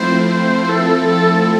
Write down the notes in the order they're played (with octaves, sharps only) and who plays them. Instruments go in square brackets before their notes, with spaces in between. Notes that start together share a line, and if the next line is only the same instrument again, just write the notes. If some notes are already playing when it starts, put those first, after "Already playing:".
Already playing: [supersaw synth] F3 A3 C4 E4 [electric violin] C5
[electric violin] C5
A4
A4